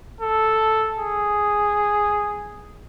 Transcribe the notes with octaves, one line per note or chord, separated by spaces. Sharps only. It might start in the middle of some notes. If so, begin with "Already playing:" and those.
A4
G#4